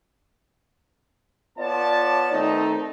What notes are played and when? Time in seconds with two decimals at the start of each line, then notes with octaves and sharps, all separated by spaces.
1.58 B3 F4 C#5 D5 A5
2.32 D#3 A3 C4 D#4